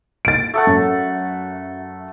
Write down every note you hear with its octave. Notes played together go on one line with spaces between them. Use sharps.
A6 D7
A3 A4 F#5
F#2